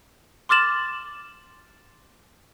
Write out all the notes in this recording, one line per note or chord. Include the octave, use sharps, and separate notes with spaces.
C6 D6 F6 A6 E7 F#7